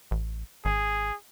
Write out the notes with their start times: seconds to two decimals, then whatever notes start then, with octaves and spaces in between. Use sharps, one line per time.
0.11 A1
0.65 G#1 G#4